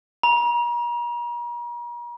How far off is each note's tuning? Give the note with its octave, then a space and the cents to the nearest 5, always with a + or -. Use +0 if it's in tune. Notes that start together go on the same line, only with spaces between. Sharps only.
A#5 +40